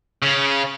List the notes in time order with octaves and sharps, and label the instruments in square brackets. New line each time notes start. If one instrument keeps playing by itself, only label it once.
[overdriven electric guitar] C#3